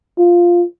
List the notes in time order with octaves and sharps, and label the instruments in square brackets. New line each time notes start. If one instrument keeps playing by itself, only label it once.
[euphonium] F4